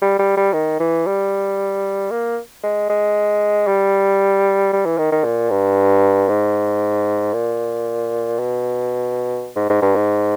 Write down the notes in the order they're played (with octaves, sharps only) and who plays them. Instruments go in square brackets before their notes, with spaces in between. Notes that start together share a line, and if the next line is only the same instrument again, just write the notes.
[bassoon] G3
G3
G3
D#3
E3
G3
A#3
G#3
G#3
G3
G3
E3
D#3
D#3
A#2
G2
G#2
A#2
B2
G#2
G#2
G2
G#2